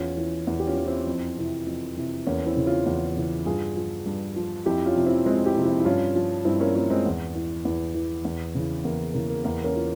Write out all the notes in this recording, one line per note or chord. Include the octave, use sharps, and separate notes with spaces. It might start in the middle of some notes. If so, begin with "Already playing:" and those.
Already playing: E2 C#4 F4
E3
E2
G4
C#4 F4
E3
C4 E4
F2
C3 E3
F2
C3 E3
E2 A#3 C#4
C4 E4
C#3 E3
C#4 F4
E2
C#3 E3
G2 F4 G#4
F3
G2
F3
F2 E4 G4
C#4 F4
C3 F3
C4 E4
F2 G#3 C4
E4 G4
C3 F3
C4 E4
E4
G2 C#4 F4
F3
G2 C4 E4
A#3 C#4
F3 A#3 C#4
G#3 C4
E2
E3
E2
E3
E2
C#3 E3
E2 A#3
C#3 E3 A#3
A#3
E2 A#3
A#3 C#4
E3 F4